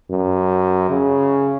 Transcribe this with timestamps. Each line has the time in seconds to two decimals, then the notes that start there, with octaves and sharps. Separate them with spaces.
0.10 F#2
0.90 C#3